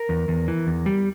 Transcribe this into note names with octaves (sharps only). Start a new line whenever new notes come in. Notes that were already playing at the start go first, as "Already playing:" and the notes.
Already playing: A#4
E2
E2
E3
E2
G3